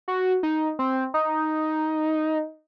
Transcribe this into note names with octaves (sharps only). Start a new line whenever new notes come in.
F#4
D#4
C4
D#4